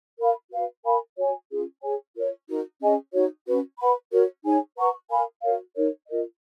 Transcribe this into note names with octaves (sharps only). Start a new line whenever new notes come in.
A#4 F5 B5
F#4 B4 F5
A#4 F5 G#5 B5
F#4 C#5 G#5
C#4 F4 G#4
G#4 C#5 G#5
F4 A#4 C#5
D#4 F#4 A#4
C#4 G#4 D#5 G#5
D#4 F#4 C#5
C#4 F#4 B4
B4 F#5 B5
F#4 A#4 C#5
D#4 G#4 C#5 G#5
B4 F#5 A#5 C#6
A#4 F5 G#5 B5
F#4 A#4 C#5 F5
D#4 A#4 C#5
F4 A#4 D#5